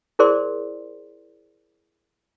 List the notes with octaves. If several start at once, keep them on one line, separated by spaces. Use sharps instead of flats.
E4 G#4 A#4 C5 D5 C6